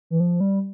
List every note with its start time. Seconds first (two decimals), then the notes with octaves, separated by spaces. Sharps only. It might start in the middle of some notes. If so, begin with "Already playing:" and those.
0.10 E3
0.20 F3
0.40 G3